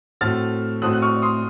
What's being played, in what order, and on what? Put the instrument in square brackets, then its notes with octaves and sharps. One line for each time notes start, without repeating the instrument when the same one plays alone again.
[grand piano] A2 A3 C4 F#4 A4 [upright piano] F6 A6
[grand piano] A2 A3 C4 F#4 A4 [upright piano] D#6 F#6
[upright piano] F#6
C#6 F6
C6 D#6